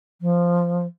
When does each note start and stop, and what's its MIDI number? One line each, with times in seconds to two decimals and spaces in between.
0.21 0.86 53